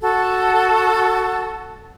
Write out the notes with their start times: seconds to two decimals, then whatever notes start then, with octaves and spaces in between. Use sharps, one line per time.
0.01 F#4 A4